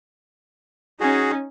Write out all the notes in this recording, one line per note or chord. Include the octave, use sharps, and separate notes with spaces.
C#4 D#4 F#4 G#4